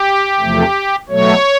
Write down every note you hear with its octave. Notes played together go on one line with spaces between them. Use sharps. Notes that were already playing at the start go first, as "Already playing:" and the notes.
Already playing: G4
E2 C3 F3 A3
B2 F#3 A3 C#5